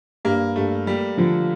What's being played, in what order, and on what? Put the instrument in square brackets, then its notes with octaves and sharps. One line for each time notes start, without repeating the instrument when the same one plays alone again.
[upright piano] G2 [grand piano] A#3
[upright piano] G2 [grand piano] A3
[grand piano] G3 [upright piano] A#3
[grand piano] D3 [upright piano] F3